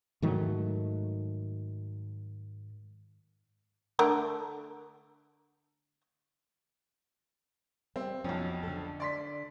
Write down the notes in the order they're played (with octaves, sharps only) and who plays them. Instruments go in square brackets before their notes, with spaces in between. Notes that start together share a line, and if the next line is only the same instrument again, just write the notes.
[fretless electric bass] G#2 D#3 F#3 A3
[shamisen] D3 A3 A#4
[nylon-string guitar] G3 [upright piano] C4
[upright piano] B1 F2 [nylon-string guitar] C#4
[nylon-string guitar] D3 A4
[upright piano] D5 C6 B6